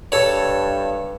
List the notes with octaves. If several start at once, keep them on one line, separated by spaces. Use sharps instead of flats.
G2 A4 C#5